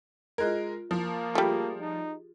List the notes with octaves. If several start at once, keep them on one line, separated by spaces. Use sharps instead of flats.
G#3 F4 A#4 F#6 G#6
F3 A#3
G3 A3 F4 G4 G#4
D#4